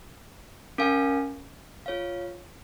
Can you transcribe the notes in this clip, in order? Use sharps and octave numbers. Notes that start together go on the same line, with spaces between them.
C#4 A#4 F5 G#5
F4 C#5 F5